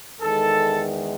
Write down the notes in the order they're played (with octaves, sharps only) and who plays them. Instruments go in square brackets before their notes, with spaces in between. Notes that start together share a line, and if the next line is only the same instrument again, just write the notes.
[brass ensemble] E2 D#3 G#3 A4